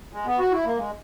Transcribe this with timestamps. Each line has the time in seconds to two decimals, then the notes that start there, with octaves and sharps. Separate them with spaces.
0.13 G#3
0.26 B3
0.39 F#4
0.52 E4
0.64 A#3
0.77 G#3